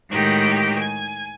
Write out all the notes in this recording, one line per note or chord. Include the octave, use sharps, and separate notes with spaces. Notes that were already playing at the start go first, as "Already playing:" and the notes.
A2 D#3 G#3 D#4 F#4 G4
G#5